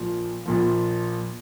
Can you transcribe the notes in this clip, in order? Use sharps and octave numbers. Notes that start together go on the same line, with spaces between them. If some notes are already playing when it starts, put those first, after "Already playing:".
Already playing: A#1 A#2 F3
A#1 A#2 F3